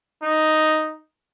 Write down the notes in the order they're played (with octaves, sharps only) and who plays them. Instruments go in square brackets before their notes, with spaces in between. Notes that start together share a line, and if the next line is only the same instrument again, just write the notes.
[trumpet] D#4